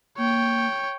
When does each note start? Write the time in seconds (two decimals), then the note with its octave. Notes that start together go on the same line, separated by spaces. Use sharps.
0.18 A#3 C#5 G5